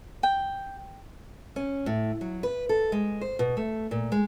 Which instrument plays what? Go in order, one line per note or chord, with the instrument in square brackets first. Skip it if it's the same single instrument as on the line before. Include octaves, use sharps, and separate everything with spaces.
[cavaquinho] G5
[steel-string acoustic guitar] C#4
A2
F#3
B4
A4
G#3
C5
B2
A3
A#2
G#3